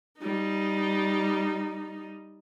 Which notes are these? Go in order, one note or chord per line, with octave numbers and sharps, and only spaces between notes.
G3 D#4